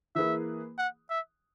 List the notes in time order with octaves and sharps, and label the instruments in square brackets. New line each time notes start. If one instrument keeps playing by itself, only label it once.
[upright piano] E3 A#3 E4 G#4 B4 [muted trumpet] E5
[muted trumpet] F#5
E5